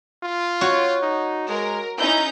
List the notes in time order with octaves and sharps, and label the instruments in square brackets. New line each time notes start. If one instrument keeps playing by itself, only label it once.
[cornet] F4
[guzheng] F#4 C#5
[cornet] D#4
[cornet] G#3 [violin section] A#4
[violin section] C#4 D#4 G6 [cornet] E4